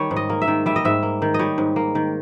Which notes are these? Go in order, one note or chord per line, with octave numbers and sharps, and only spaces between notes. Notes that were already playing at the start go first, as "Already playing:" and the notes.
Already playing: D#3 G3 C#5
G#2
D#5
A#3
E5
D#3
G3 E5
D#5
G#2 E5
A#3
D#3
D#5
G3 C#5
G#2
A#3
D#3